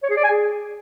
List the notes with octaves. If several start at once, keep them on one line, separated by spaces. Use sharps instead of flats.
C#5
G#4
D5
G#5
G#4